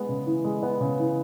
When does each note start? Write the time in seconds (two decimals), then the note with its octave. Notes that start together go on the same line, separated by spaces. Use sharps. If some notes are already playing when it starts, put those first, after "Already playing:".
Already playing: G#3 B3
0.09 C#3
0.26 E3
0.44 G#3
0.63 B3
0.81 C#3
0.99 E3